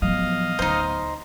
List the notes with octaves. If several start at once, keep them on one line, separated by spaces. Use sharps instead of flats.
A2 F3 F#3 B3 D#5 F5
D2 D#4 C5